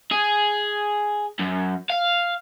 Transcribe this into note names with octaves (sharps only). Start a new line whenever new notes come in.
G#4
F#2
F5